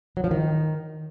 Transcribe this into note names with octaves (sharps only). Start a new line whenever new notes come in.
F#3
F3
D#3